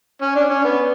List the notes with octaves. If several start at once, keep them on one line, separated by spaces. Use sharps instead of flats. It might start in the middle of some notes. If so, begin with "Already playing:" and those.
C#4
D4
C#4
B3